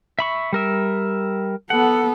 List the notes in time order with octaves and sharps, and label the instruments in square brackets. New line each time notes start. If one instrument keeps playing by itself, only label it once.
[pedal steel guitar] E5 B5 C#6
G3 A#4 E5
[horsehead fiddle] B3 A4 [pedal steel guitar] F#5